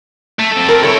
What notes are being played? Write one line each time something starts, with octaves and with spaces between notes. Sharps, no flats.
A3
C4 A4
A#4
C4 E4 A4 C#5